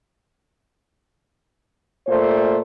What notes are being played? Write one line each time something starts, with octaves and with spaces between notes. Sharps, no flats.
A#2 A3 C5